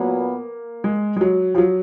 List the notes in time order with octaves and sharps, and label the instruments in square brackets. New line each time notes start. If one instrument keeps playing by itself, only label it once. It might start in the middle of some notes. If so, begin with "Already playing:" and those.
Already playing: [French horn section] A#2 F#3 B3 [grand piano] A#3
[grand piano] G#3
G#3
F#3
F3
F#3